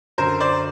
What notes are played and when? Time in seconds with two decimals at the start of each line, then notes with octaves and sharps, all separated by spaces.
0.18 F#2 D3 A#4 C5
0.40 C5 D5